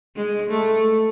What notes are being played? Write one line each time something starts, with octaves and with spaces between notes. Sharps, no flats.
G#3
A3